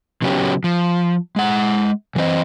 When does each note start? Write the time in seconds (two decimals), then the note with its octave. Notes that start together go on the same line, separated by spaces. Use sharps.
0.22 C#3 F#3 B3 C#4 F#4 G4
0.64 F3
1.36 G#3 F#5
2.16 F#2 E3 C4 C5 D#5